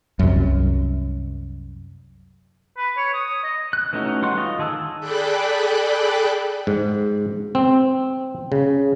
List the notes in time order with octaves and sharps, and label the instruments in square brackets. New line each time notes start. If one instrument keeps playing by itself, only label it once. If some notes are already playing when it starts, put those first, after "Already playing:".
[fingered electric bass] C2 F#2
[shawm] B4
C#5
D#6
D#5
[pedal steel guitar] F#6
E3 A3 C#4 D#4 F#4
G3 F#5 C6 C#6 F#6
F4 D#5
D#3 G#4 A5 E6
[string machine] G#4 A4 D5 G5 B5 F#6
[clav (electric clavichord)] G#2
C4
C#3